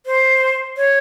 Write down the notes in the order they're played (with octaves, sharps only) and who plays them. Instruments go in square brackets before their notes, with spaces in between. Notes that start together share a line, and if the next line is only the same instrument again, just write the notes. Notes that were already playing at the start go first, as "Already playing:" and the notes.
[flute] C5
C#5